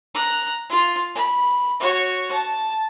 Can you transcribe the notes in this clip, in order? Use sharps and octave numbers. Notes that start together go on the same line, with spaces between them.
A#5 F#6
F4
B5
F#4 C#5
A5